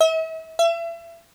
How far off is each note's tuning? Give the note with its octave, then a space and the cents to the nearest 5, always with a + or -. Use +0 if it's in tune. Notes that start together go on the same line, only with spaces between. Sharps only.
E5 -40
E5 +35